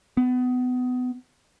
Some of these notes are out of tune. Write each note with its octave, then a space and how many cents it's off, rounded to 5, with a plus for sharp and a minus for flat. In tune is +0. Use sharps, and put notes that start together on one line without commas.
B3 +25